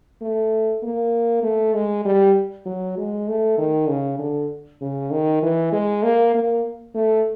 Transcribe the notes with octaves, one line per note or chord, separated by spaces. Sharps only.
A3
A#3
A3
G#3
G3
F#3
G#3
A3
D#3
C#3
D3
C#3
D#3
E3
G#3
A#3
A#3
A3